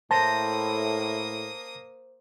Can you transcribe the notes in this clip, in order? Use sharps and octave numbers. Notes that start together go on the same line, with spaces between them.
A2 A#3 C5 A5 D#6 A#6